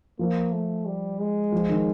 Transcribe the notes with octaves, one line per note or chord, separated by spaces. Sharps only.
F3 A#3
A3
G3
G#3
F3
D#3